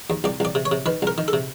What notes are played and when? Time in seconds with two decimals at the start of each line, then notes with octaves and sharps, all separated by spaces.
0.10 D#2
0.24 C2 D5
0.40 C2 D5
0.55 C3
0.65 C#5
0.72 C3
0.86 D#3 B4
1.02 C2 A#4
1.18 D#3
1.28 A4
1.33 C3